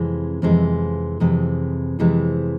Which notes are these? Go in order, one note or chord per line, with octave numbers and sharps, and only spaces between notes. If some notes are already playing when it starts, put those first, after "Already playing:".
Already playing: F2 C3 E3 G#3
F2 C3 E3 G#3
F2 C3 E3 G#3
F2 C3 E3 G#3